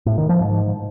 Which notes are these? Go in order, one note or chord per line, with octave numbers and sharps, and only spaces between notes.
A2
D#3
F3
G#2